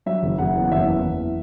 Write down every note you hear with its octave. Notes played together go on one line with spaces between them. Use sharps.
F#3 E5
F#1
F#1 F#5
E2
F#5
F#1 E5
E2
E2